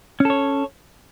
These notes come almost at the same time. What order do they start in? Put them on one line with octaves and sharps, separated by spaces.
C#4 A4 C#5